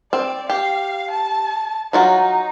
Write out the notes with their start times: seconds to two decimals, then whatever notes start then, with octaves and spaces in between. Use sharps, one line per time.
0.13 C4 D5
0.50 G4 F5
1.11 A5
1.93 F#3 D#4 F4 F#4